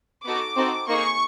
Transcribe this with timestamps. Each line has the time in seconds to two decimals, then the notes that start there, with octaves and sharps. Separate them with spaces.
0.25 B3 D#4 F#4 A4 D6
0.56 C4 D#4 F#4 A4
0.87 A#3 D#4 G#4 C#6